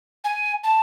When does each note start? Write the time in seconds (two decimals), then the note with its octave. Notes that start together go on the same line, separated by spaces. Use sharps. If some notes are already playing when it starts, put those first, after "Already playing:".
0.24 G#5
0.64 A5